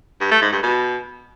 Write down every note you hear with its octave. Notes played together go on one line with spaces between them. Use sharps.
G2
A3
G#2
G2
B2